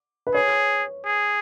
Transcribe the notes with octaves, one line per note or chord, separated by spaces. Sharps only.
B4
G#4 C#5
G#4